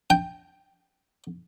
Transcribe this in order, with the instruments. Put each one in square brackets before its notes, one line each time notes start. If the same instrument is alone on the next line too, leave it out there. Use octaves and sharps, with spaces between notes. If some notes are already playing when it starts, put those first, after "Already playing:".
[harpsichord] G5